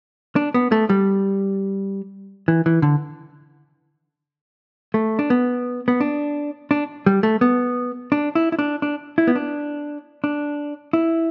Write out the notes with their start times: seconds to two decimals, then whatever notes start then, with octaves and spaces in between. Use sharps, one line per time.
0.36 D4
0.54 B3
0.72 A3
0.90 G3
2.48 E3
2.66 E3
2.82 D3
4.94 A3
5.19 D4
5.30 B3
5.88 B3
6.00 D4
6.71 D4
7.06 G3
7.23 A3
7.41 B3
8.12 D4
8.35 E4
8.52 E4
8.59 D4
8.82 D4
9.18 E4
9.27 B3
9.36 D4
10.24 D4
10.93 E4